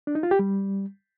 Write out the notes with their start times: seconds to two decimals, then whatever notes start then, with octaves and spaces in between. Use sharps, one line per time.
0.07 D4
0.15 D#4
0.23 F4
0.31 G4
0.39 G3